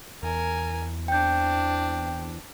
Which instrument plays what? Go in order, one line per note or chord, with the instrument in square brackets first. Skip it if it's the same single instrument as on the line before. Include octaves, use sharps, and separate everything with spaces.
[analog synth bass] E2 [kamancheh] A#4 G#5
[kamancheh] C4 D4 [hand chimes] G5 G6